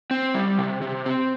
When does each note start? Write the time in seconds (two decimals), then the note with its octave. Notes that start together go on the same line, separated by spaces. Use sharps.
0.11 C4
0.34 G3
0.59 C3
0.82 C3
1.06 C4